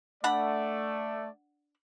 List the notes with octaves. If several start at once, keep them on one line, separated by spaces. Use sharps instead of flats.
A3 D4 D5 F#5 B5